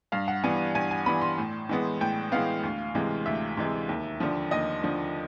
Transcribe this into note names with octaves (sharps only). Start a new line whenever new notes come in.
G2 F5
F#5
E3 G3 B3 G#5
G2 G#5
G#5
E3 G3 B3 B5
C6
A2
E3 G#3 B3
A2 G5
E3 G#3 B3 F5
D2
C3 E3 G#3
D2 E5
C3 E3 G#3
D#2
D3 F3
D#2 D#5
D3 F3